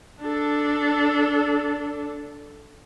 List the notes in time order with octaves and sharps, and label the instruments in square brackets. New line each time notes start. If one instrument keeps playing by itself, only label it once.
[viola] D4 A4